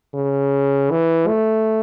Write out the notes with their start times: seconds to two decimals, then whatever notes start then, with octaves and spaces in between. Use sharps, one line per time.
0.14 C#3
0.90 E3
1.28 A3